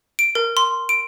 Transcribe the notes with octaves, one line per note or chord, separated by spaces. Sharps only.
D7
A#4
C6
D7